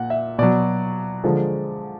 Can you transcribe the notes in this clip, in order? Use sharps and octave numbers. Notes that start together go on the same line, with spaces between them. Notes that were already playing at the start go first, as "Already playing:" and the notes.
Already playing: A#2 F#5
E5
B2 F#3 D5
D3 F3 G#3